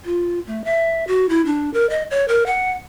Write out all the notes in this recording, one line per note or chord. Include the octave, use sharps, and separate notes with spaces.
F4
A3
E5
F#4
E4
D4
A#4
D#5
C#5
A#4
F#5